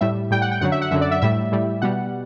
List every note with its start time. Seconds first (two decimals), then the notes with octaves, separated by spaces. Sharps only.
0.01 A2 G3 E5
0.31 A2 G3 G5
0.42 F#5
0.51 G5
0.61 F#2 D3 F#3 F#5
0.72 E5
0.81 F#5
0.91 F#2 D3 F#3 E5
1.01 D5
1.11 E5
1.22 A2 G3 E5
1.52 A2 G3
1.82 B2 G3 F#5